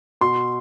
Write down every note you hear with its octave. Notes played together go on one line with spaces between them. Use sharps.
B2 C6